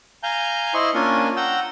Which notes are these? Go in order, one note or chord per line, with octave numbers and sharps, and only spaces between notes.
F5 G#5 A#5 G6
E4 C5 D#5 C6 C#6
A#3 C#4 D4 F4 A#4 G#5
F#5 G5 A#5 E6